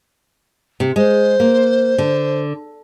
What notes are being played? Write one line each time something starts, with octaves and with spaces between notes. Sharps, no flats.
C3
G#3 C5
A#3
D3